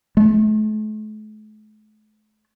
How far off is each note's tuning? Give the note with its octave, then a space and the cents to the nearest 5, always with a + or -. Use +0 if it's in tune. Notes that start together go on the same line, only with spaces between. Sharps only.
A3 -45